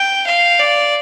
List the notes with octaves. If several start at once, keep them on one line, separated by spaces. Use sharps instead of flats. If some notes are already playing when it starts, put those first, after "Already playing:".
Already playing: G5
F5
D5